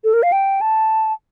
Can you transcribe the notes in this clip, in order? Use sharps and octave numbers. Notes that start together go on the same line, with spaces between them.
A4
A#4
F5
G5
A5